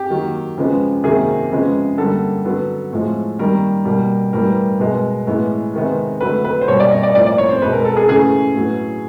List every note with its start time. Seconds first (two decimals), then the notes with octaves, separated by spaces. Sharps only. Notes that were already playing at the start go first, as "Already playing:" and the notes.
Already playing: G4
0.10 D#3 F#3 A#3
0.57 C#3 F3 G#3 B3
1.04 C3 D#3 F#3 A#3 G#4
1.52 C#3 F3 G#3 B3
1.98 D3 G3 A#3 A4
2.45 D3 F#3 B3
2.92 A2 F3 G#3
3.39 D#3 G3 A#3 A#4
3.85 B2 G3 A#3
4.33 A2 E3 G3 B3 A#4
4.79 B2 G#3 B3
5.27 A2 E3 G#3 B3
5.74 C3 D#3 G#3 B3
6.21 D3 F#3 A3 B4
6.45 B4
6.61 C5
6.68 B2 G3 A#3 C#5
6.80 D5
6.91 D#5
7.03 D5
7.14 A2 F3 A#3 D5
7.26 D5
7.38 C#5
7.49 C5
7.61 B2 G#3 B3 B4
7.73 A#4
7.85 A4
7.96 G#4
8.08 C#3 E3 A3 G#4
8.55 A2 F#3 B3